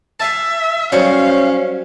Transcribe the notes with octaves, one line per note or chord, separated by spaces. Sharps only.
E5 F5 G#5 A5
F#3 G3 C#4 C5 C#5 F5